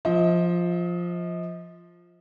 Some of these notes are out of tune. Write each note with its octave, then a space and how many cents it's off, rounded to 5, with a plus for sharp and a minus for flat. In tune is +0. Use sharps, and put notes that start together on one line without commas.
F3 +0 D#5 +35